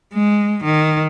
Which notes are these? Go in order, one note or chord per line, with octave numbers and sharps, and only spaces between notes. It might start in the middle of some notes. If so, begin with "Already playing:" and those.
G#3
D#3